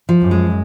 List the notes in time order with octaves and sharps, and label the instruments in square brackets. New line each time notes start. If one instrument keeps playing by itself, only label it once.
[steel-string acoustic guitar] F3
[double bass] F#2
[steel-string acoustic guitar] G#3